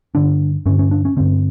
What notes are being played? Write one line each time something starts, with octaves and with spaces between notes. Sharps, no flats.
G2 D3 D4
G2 D3 C#4
C#4
D4
C#4
G2 D3 C4